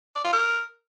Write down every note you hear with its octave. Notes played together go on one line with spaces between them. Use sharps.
D5
F4
A#4